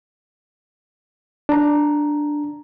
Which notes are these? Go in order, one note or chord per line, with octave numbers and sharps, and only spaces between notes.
D4 A#5